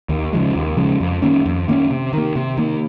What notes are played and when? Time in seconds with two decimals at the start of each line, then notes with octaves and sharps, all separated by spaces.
0.09 D#2
0.33 C#3 F3 G#3
0.56 D#2
0.77 C#3 F3 G#3
1.00 F2
1.22 D#3 A#3 C#4
1.46 F2
1.68 D#3 A#3 C#4
1.91 C3
2.13 D#3 A#3
2.36 C3
2.57 D#3 A#3